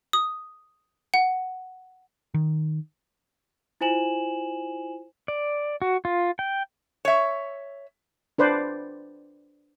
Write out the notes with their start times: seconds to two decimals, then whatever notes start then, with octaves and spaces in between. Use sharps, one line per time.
0.13 D#6
1.14 F#5
2.34 D#3
3.81 E4 F4 C5 G#5 E7 F#7
5.28 D5
5.82 F#4
6.05 F4
6.39 G5
7.05 C#5 E5
8.38 D4 B4 C5 D5